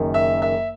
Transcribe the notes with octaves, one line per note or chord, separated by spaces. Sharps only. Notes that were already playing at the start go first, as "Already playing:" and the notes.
Already playing: F#1 F#2 D#3
E5
E5